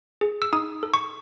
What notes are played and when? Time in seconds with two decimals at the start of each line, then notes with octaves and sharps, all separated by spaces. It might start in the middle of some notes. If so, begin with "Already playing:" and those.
0.21 G#4
0.42 E6
0.53 D#4 D#6
0.83 A4
0.94 C#6